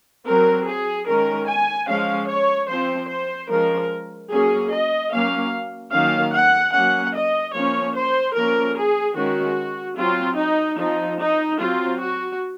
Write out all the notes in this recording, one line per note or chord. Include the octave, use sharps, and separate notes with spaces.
F#3 C4 A#4
G#4
D#3 G#3 C#4 A#4
G#5
F3 G#3 C#4 F5
C#5
F3 C4 C5
C5
F3 G#3 C#4 A#4
F#3 A#3 C#4 G#4
D#5
F#3 A#3 C#4 F5
D#3 F#3 A#3 C#4 F5
F#5
F#3 A#3 C#4 F#5
D#5
F3 A#3 C#4 C#5
C5
F3 A#3 C#4 A#4
G#4
D#3 G#3 C#4 F#4
F#3 C4 F4
D#4
F3 C4 D#4
D#4
F#3 C4 F4
F#4